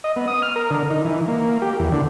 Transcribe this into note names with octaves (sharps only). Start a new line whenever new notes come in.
D#5
B3
D#6
F6
A#4
D3
D#4
E3
A#3
G4
E2
D3